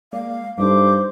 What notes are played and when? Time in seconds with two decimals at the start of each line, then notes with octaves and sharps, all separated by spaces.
0.13 G#3 A#3 D5 F5
0.58 G2 G3 D#4 A4 C5 D6